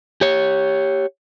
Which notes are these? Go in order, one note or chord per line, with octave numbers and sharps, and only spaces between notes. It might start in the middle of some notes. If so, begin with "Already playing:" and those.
G4 C#5